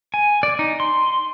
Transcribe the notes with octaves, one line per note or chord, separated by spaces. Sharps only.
G#5
D5
D#4
C6